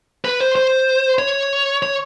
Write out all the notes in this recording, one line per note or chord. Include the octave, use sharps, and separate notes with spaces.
B4
C5
C5
C#5
C#5